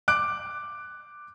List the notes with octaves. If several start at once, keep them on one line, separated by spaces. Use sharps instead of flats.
D6 F#6 D7